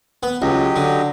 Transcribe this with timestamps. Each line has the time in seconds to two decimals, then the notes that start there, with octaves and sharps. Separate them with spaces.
0.23 B3
0.42 C#2 F#3 G4 D#5
0.76 D3